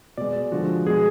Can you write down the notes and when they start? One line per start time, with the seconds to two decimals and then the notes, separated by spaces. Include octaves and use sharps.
0.17 B2 G#3 D5
0.52 D3 F3 G#3 F#4
0.86 B2 G#3 G#4